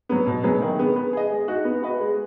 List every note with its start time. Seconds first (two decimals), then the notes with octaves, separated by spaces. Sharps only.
0.09 F#3 B3
0.27 B2
0.44 F#3 B3 G#4
0.62 D#3
0.78 G#3 B3
0.96 B3
1.13 G#4 D#5
1.31 G#3
1.48 D#4 F#4
1.65 B3
1.82 F#4 B4 D#5
2.00 G#3